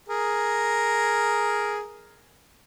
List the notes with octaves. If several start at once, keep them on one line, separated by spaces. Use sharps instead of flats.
G#4 A#4